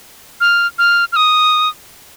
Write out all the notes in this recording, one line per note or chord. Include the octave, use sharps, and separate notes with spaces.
F6
F6
F6
D#6